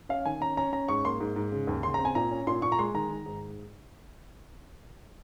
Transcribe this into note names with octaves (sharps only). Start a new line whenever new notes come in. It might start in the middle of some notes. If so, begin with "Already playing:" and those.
C#4 F5
D#3 G#5
C#4 A#5
C#4 A#5
C#4 A#5
G#2 C#6
A#3 C6
G#2
G#2
C#3
D#2
C#3 C6
C4 A#5
G#5
A#2 A#5
C#4
A#2 C6
A#2 C#6
A#5
G#3 C6
D#3 A#5
D#3
G#2